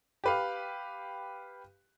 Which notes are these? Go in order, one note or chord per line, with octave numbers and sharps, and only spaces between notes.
G4 B4 F5